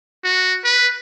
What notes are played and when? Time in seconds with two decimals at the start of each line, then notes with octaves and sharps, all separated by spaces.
0.24 F#4
0.64 B4